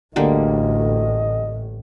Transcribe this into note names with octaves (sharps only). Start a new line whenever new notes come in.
A1 D2 A2 D3 G3 A#3 D#5